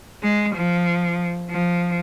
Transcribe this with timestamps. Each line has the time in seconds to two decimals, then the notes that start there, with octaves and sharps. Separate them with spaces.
0.23 G#3
0.55 F3
1.50 F3